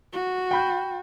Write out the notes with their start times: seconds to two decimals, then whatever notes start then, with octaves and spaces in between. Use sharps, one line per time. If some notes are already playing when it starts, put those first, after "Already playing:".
0.13 F#4
0.51 G5 B5 G6